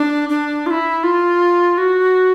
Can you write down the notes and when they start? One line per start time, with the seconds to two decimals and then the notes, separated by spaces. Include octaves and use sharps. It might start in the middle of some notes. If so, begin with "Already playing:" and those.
Already playing: D4
0.29 D4
0.66 F4
0.71 E4
1.03 F4
1.78 F#4